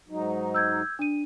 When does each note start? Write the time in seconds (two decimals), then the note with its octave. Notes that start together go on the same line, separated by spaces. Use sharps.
0.09 G#2 F#3 D#4
0.54 E6 G6 G#6
0.99 D4 D#7